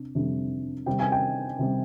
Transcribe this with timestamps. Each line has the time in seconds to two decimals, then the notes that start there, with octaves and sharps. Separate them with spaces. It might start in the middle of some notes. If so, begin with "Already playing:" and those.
Already playing: C3 D4
0.15 F2 C3 G3 D4
0.86 C3 G3 C4 G5
1.00 G#5
1.12 G5
1.59 C3 G3 C4